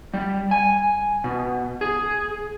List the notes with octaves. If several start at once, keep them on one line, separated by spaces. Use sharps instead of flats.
G3
G#5
B2
G#4